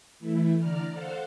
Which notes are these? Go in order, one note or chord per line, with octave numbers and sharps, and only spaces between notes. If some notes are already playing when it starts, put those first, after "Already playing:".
E3 A3 E4
D3 D5 A#5 F6
A4 C5 F5 F#5